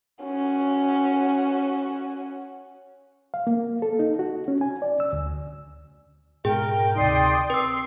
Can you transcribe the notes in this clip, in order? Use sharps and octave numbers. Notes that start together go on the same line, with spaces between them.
C#4 F#4
F5
A#3
A4
D#4
F#4
C#4
G#5
D5
E6
D2
G#2 B2 G#4 A#4 G5
D2 C3 D#4 D5 C6 D#6
C4 B4 C6 E6